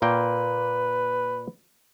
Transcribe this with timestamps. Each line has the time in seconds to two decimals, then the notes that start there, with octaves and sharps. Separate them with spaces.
0.02 A#2 A#3 B4 G5